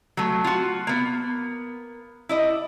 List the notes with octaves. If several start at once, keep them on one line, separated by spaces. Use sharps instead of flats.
F#3 A3
F4 F#4
A#3 B3
E4 D5 D#5